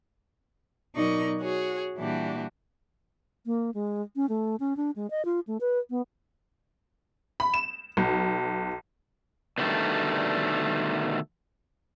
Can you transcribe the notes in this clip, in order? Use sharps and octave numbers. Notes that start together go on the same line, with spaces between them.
B2 F#3 D#4 A#4 D5 C#6
F#4 G#4 C#5
A#2 E3 G3 D4 F#4 G4
A#3
G#3
C#4
A3
C#4
D4
G#3
D#5
F4
A3
B4
B3
B5
E7
B1
B2 D3 D#3 G3 A3